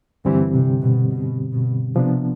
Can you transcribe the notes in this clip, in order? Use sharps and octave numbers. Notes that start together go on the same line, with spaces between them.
G2 D3 E3 G3 C4 G4
C3
B2
B2
B2
C3 F3 B3 D4